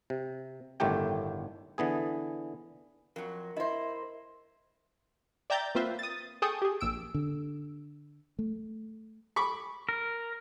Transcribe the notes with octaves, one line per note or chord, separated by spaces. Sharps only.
C3
G1 A2 D#3 A3 G4 G5
D3 E3 B3 G#4
F2 F#3 A#4
E4 C5 D#5 E5
D5 E5 G5 A#5 G6 A6
A#3 C4 F4 B4 C5 E5
D#6 A6
G#4 A4 G5 A5 C#6 D#6
G4 G#4
A#1 A#2 E6 D7
D3
A3
B5 C#6 D6
A#4